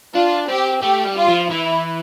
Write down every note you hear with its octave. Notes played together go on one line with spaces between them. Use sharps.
D4 F4
C4 G4
A3 G4
G3
F4
F3
E3 E4